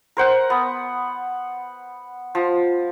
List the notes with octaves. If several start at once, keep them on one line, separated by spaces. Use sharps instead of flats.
A#4 C5 F#5
B3
F3